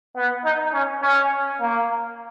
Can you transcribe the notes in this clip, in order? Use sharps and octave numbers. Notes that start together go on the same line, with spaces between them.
B3
D#4
C#4
C#4
A#3